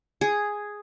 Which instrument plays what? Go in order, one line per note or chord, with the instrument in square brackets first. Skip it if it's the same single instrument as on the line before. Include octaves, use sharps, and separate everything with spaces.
[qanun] G#4